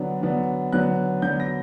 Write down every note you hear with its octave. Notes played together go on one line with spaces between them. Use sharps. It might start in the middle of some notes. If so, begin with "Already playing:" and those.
Already playing: D3 F#3 B3 D4
D3 F#3 B3 D4
D3 F#3 B3 D4 F#6
D3 F#3 B3 D4 G6
A#6